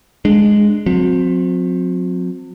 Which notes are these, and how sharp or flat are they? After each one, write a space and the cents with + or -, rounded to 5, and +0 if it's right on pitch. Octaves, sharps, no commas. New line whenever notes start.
G#3 +0 D4 +15
F#3 -45 C4 +0